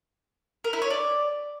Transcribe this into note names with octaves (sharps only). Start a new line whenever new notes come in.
A#4
E4
C#5
D5